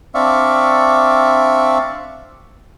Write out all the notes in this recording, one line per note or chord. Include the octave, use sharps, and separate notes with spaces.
C4 D4 D5 E5 F5 C#6